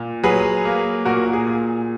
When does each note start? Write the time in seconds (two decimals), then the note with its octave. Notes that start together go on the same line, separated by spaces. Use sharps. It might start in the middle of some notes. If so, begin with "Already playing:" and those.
Already playing: A#2
0.23 F#3 G#4 B4
0.65 A#3
1.05 A#2 F#4 A#4
1.33 G#4
1.46 A#2